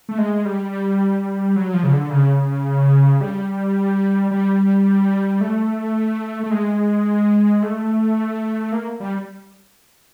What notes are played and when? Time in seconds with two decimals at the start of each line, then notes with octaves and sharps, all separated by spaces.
0.09 A3
0.18 G#3
0.45 G3
1.56 F#3
1.74 F3
1.83 C#3
1.92 D3
2.10 C#3
3.21 G3
4.31 G3
5.41 A3
6.43 A3
6.51 G#3
7.63 A3
8.72 A#3
9.00 G3